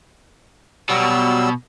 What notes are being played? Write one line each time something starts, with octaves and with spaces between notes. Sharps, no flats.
B2 F#3 G3 E6